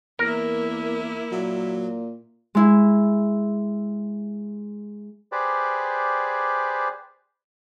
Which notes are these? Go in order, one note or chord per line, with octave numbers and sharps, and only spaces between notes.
E2 A#3 E4 A#4
A#2 F#3
G#3 E4
G4 G#4 B4 C5 D5